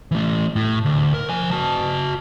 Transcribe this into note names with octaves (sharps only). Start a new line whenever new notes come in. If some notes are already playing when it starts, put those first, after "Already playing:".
E3 A3
A2
D2
A#4
F3 G#5
F#4 A5